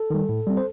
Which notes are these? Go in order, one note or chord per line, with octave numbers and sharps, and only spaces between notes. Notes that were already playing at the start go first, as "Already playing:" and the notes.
Already playing: A4
D#3 G3
A2
G3 C4
C5